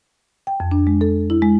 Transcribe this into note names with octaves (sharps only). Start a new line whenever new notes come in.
G5
F2
D4
G#3
A4
E4
G#3